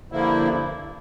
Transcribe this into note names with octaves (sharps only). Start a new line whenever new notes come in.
G2 D3 F3 A#3 E4